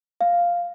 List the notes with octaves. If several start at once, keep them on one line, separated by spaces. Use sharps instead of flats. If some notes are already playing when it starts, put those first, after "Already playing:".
F5